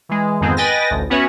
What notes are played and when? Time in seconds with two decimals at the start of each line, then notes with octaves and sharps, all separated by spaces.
0.09 E3 G#3
0.41 F2 G#2 D#3 G#3 B3 C4
0.57 B4 D#5 G5 G#5 A6 A#6
0.90 A1 D2
1.10 B3 C#4 F#4 B4 C#5 E5